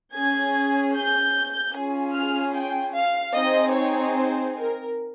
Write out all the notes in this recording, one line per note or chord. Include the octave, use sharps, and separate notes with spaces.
C#4 G#4 G#6
G6
C#4 F4 G#4
F6
G5
F5
C4 D#4 G#4 D#5
C#5
C5
A#4